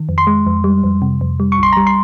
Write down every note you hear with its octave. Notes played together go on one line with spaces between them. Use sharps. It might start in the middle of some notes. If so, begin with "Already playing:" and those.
Already playing: D#3
F2
C6
G#3
F2
G3
F2
C3
F2
G3
C#6
A#1 C6
G3 A#5
C6